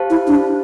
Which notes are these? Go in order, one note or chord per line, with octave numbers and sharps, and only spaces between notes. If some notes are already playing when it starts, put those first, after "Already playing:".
Already playing: G4 C5 F5 A5
E4
D4